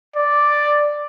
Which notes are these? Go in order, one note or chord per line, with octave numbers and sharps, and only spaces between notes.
D5